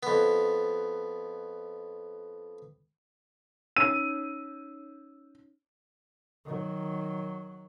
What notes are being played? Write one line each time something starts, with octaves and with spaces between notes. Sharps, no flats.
F2 B3
C#4 D#4 C#5 E6 D#7
D#3 F#3